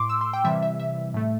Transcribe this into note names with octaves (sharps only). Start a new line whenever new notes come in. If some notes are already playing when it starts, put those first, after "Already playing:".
Already playing: A2 C6 D6
E6
C6
G5
C3 E3 G3 E5
E5
E5
A2 A3